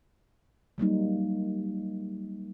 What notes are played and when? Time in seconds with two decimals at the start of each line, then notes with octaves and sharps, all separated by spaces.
0.78 F#3 G3 A#3 D#4